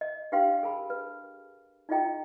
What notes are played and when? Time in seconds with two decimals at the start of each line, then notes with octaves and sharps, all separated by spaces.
0.01 D#5
0.32 D4 G4 B4 F5 G5 C6
0.63 G#4 A#4 A5 B5
0.90 B4
1.89 D#4 F4 G#4 D#5 G5 A#5